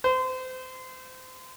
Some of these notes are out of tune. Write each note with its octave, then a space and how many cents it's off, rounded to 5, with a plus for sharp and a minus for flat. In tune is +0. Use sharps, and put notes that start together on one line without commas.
C5 -30